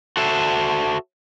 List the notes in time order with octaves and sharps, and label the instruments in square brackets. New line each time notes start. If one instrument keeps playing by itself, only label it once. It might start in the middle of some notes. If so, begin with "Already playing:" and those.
[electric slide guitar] F#4 A4 C5 E5